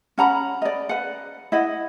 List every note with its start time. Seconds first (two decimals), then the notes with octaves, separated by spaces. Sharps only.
0.18 C#4 F#5 A#5 B5
0.62 D5 D#5
0.89 B4 F#5
1.52 E4 D#5 F#5